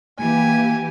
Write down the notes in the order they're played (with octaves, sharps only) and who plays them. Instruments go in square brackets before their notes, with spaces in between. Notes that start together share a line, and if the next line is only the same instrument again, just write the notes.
[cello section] E3 G4 [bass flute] A#3 [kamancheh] G#5